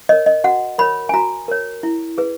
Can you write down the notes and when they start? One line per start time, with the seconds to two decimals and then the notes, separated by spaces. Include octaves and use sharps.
0.09 A#4 C#5 D#5
0.26 D#5
0.44 F#4 F#5
0.78 A#4 C#5 B5
1.09 G#5
1.14 F#4 A#5
1.48 A#4 C#5
1.83 E4
2.18 G#4 B4